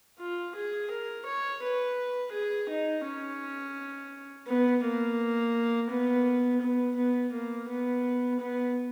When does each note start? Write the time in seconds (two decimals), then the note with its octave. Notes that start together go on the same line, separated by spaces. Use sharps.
0.19 F4
0.55 G#4
0.91 A#4
1.25 C#5
1.62 B4
2.32 G#4
2.69 D#4
3.05 C#4
4.47 B3
4.83 A#3
5.90 B3
6.61 B3
6.96 B3
7.33 A#3
7.69 B3
8.40 B3